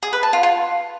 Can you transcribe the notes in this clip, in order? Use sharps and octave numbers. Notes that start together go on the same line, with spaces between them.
G#4
B4
A5
F4
F4